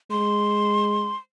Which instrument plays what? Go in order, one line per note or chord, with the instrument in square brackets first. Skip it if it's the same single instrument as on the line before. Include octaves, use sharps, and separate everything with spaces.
[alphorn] G#3 [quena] C6